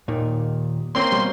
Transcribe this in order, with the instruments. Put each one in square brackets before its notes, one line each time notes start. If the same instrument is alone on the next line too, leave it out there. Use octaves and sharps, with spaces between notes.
[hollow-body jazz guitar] D#2 A#2 D#3
[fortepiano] A#3 C4 C#4 [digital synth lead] C6
[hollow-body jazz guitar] B2 G3